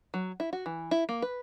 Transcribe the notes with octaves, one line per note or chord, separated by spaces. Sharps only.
F#3
E4
F#4
E3
E4
A#3
B4